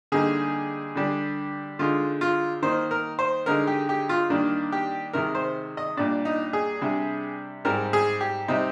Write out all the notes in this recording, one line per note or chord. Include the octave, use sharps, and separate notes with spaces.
D3 G3 A#3 D#4 G#4
D3 G3 D4
D3 G#3 D#4 F4
F4
D#3 A#3 D#4 C5
A#4
C5
D3 G#3 D#4 A#4
G4
G4
F4
D#3 G3 A#3 D4
G4
C3 D#3 G#3 A#4
C5
D#5
A#2 G3 D4 D5
D#4
G#4
C3 G3 D4
G#2 G3 C4 A#4
G#4
G4
C3 G3 C4 D#4